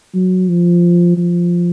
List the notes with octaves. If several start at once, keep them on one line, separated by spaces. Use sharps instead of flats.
F#3
F3
F3